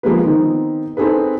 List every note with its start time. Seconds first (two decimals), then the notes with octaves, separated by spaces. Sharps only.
0.03 F3 G#3 A#3 B4
0.25 D#3 B3 C4 D#4
0.97 C4 D#4 G#4 A4 B4